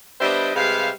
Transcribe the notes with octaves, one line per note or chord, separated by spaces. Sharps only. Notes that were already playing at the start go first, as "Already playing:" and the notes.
G3 B3 D4 C5 D#5 E5
C3 G3 G#3 B4 F5